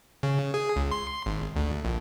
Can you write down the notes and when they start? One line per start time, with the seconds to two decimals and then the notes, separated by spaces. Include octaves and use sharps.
0.23 C#3
0.54 G#4
0.76 C#2
0.92 C6
1.26 G#1
1.56 D2
1.85 A#1